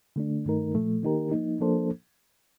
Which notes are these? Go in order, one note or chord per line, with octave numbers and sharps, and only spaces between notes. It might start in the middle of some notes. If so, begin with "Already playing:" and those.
D3 A3 D4
G2 D#3 A3 D#4 A#4
A#2 F3 A3
D#3 A#3 D#4 G4 A#4
F3 A#3 D#4
F3 A#3 D4 A4 C5